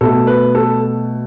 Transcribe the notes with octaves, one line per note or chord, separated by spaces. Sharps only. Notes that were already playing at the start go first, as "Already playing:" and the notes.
B2 A3 A4
B4
A4